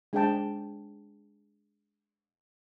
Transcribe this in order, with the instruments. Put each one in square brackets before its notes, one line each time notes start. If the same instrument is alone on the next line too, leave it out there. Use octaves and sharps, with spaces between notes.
[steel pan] G#3 D4 G#4 C5 G5 A5